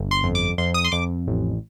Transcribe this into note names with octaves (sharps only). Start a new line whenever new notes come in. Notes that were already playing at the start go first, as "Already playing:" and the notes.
Already playing: G1
C6
F2
D6
F2 C6
D#6
C6
F2 D6
A1